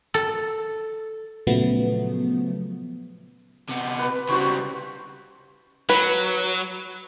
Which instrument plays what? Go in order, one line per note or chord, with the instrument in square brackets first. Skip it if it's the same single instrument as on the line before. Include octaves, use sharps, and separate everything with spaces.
[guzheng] A4
[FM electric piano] A#2 C#3 F3 F#3 A3 B3
[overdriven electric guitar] C3 B3
[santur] B4
[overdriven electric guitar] C#3 G3 [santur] F#4 C5 C#6
[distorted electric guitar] F#3 [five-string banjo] B4